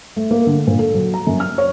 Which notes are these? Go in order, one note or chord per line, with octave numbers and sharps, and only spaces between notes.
A3
A#3
D3
A#2
A4
F#3
A#5
F#2
F6
C#5